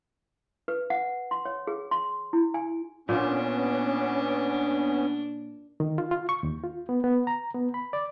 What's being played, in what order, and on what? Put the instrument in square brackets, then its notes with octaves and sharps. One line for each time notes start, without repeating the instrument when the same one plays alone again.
[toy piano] B4
F#5
C6
C#5
G#4
C6
E4
G#5
[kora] A#2 F4 [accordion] B3 C#4 [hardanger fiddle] D4
[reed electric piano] D#3
F4
F4
C#6
D#2
F4
B3
B3
A#5
B3
B5
D5